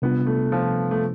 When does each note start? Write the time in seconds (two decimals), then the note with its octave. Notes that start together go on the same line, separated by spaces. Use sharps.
0.02 C3 G3 B3 D4 F4
0.26 A3
0.52 F3
0.91 A3